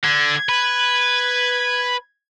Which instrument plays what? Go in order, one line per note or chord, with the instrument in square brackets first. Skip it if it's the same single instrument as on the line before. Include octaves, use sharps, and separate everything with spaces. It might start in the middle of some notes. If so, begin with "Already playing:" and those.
[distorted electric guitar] D3 [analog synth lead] G#6
[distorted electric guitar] B4